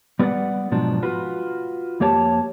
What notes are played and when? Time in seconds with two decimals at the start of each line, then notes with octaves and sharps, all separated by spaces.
0.19 G3 B3 B4 D5 F#5
0.71 G#2 B2 F3 F#3 D4
1.03 F4 F#4 B4
2.00 F2 A#3 G4 C#5 A5